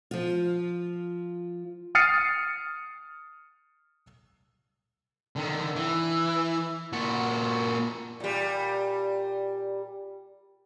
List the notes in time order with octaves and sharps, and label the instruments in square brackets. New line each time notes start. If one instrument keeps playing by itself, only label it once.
[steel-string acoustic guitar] F3 F4
[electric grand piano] D#6 F6 A6 C7 C#7 D#7
[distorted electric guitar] D3 D#3
E3
A#2 F#4
[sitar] A#2 G3